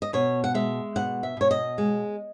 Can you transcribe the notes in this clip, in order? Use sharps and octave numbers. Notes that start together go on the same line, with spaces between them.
D#5
B2 C#5
F#5
G#3 E5
B2 F#5
E5
B2 C#5
D#5
G#3